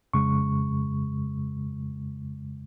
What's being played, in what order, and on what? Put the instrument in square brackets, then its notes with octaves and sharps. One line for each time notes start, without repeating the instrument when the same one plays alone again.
[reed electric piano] F2 C#3 G#3 C#6